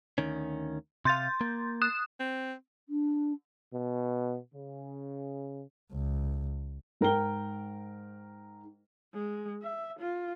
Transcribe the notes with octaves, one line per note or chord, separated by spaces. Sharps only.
D2 D#3 C#4
C3 F5 C6 G6 A6
A#3
D#6 F#6 E7
C4
D4
B2
C#3
C#2
G#2 A#4 G5 G7
G#3
E5
F4